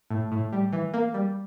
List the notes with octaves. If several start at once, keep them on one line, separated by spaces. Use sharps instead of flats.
A2
A2
G3
E3
A#3
G3